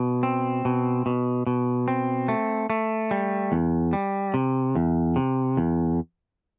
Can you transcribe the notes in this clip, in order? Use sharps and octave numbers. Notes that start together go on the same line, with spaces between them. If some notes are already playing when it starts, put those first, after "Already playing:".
Already playing: B2
C4
B2
B2
B2
C4
A3
A3
G3
E2
G3
C3
E2
C3
E2